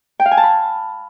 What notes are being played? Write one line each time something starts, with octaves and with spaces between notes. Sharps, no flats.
G5
F5
G#5
A5
B5